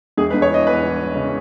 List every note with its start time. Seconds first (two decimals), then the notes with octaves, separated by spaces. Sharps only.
0.18 E1 G#4
0.31 B4
0.34 E1
0.42 C#5
0.50 E3 D#5
0.67 E2 B4
0.83 E3
1.00 E3
1.15 C#3